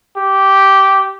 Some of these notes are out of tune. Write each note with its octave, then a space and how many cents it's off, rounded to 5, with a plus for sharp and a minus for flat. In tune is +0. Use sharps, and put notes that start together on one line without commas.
G4 -10